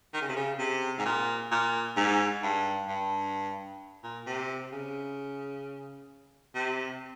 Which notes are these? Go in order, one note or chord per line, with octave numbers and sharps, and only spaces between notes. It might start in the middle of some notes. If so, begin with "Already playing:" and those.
D#3
C#3
C3
C#3
C3
G#2
A#2
A#2
G#2
G2
G2
A#2
C3
C#3
C3